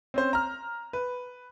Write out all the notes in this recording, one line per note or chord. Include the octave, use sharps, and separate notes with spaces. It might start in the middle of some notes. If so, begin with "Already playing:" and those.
C4 C#4 C5
A#5 F6
B4